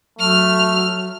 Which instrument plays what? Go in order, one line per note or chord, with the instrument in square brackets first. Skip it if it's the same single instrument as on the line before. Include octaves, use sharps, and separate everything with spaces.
[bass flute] F#3 [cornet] A3 [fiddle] F6